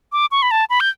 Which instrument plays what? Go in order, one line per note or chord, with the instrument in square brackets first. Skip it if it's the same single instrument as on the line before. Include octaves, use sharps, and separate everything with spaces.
[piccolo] D6
C#6
B5
A5
B5
G6